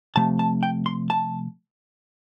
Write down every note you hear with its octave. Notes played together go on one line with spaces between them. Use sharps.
C3 F3 A3 A5
A5
G5
C6
A5